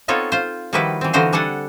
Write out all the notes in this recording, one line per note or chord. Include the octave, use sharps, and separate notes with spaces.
B3 C4 D#4 F4 A4 C#5
F4 C5
D#3 F3 G3 E4 F#4 B4
E3 C4
D3 E3 D#4 F#4 C5 F5
G3 D4 A4 F#5 G#5